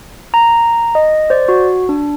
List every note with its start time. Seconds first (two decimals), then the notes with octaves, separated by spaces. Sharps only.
0.34 A#5
0.95 D#5
1.30 C5 D5
1.48 F#4
1.89 D4